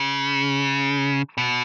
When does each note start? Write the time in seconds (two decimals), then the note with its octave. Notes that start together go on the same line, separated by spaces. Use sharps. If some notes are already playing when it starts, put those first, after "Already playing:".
Already playing: C#3
1.38 B2